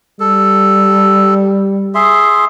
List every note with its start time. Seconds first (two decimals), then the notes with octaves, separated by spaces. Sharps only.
0.20 G3 A4
1.95 G#4 E5 C6